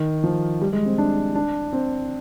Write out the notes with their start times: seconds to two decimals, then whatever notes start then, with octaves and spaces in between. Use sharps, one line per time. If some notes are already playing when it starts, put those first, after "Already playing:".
Already playing: D#3
0.24 F3
0.61 G3
0.73 G#3
0.86 C4
0.98 D4
1.35 D4
1.73 C4